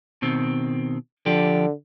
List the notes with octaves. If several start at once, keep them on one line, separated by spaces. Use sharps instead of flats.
B2 D#3 C4
D3 F3 G4